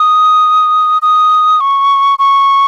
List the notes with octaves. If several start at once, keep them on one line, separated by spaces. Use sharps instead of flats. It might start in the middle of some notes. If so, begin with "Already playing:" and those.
Already playing: D#6
D#6
C#6
C#6